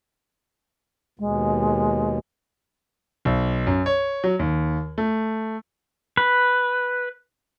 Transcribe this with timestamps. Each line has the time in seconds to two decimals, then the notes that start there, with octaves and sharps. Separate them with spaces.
1.19 D#2 B2 G#3
3.25 B1
3.67 F#2
3.86 C#5
4.24 F#3
4.39 D#2
4.98 A3
6.17 B4